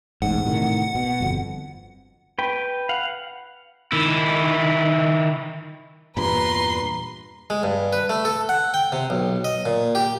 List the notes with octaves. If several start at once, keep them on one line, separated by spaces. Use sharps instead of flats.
E1 A1 G#2 F#5
A2 C3 D#3
B2
G1 F2
B4 G5
F5 F#5
D#3 E4
E2 G2 A#2 B4 A#5 C6
G#3
G2
B4
A3
A4
F#5
G5
C3
B1
D#5
A#2
G4